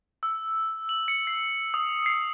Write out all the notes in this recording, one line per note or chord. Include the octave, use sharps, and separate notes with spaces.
E6
F#7
C#7
C7
D#6
C7